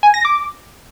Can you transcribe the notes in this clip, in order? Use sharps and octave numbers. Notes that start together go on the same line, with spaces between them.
G#5
A#6
D6